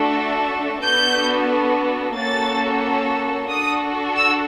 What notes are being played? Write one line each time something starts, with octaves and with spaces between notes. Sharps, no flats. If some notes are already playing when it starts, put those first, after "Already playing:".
Already playing: A3 D4 F#4 A4
B3 D4 F#4 A4 G6
A#3 C#4 F#4 A4 A6
D4 F#4 A4 D#6
E6